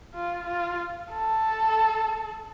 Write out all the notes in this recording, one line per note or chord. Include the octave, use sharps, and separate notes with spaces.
F4
F4
A4